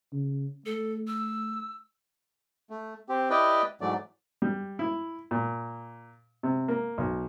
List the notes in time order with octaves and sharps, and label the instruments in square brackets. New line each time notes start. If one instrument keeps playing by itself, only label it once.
[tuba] C#3
[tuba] A3 [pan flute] A4
[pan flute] E6
[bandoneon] A3
C4 G4
E4 G4 B4 D5 D#5 G5
G#2 E3 F#3 A3 D5
[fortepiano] G3
E4
A#2
C3
A#3
B1